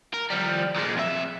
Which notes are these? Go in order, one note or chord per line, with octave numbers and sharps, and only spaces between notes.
A#4
F3 G3
A#2 G#3
F2 E5